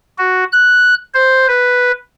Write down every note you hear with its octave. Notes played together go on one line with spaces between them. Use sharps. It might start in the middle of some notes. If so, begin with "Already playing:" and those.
F#4
F#6
C5
B4